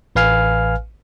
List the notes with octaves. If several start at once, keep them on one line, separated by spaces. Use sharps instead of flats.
A1 B4 F5 G#5 F6